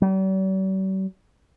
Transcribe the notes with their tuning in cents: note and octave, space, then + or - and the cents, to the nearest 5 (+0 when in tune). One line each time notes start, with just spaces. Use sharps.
G3 -45